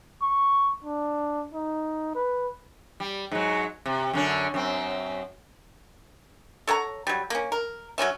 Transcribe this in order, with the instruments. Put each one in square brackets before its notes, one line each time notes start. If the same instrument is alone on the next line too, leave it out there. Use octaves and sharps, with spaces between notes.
[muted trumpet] C#6
D4
D#4
B4
[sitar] G3
G#2 F#3
C3
F#2 D3 C#4
F#2 C4
[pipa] A4 C#5 F#5 A#5
F#3 G3
A#3 C#4
A#4
F#3 A#3 C#4 E5